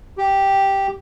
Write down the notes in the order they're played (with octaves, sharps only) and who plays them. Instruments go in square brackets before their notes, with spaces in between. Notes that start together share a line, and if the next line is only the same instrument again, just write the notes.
[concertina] G4